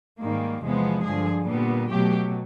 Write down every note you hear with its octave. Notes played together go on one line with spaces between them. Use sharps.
G#2 D#3 G3 A#3
E2 C3 F3 G#3 B3
G2 D3 F3 G#4
A#2 G3 B3
B2 F#3 A3 G4